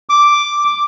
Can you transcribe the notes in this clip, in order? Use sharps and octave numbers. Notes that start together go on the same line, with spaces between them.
D6